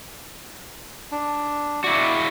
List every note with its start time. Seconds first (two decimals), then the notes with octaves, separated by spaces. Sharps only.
1.12 D4
1.84 E4 F#4 D5